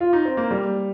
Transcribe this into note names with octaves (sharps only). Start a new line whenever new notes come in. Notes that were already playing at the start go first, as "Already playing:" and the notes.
F4
D#4
C4
A#3
G3